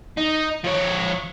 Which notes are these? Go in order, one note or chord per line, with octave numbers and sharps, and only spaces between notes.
D#4
F3 C#5